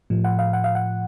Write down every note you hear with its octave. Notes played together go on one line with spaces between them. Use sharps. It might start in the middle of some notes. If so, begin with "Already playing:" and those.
A2 F3
F#5
F5
F#5
F5
F#5